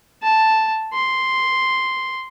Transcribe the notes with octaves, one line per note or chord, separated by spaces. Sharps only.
A5
C6